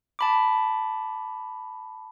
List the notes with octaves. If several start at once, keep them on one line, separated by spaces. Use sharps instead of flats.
A5 B5 D6